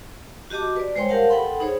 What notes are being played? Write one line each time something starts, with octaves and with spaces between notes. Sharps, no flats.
F#4 G4 D#5 A5 D6
B4 D5
G3 G#3 C5 C#5 G5 C6
G4 A#4 F5 F#5 A5
A4 B4 F#5 G5 B5 C6
D#4 G#4 C5 C#5